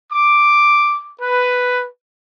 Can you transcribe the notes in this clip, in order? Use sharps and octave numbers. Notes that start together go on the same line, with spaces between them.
D6
B4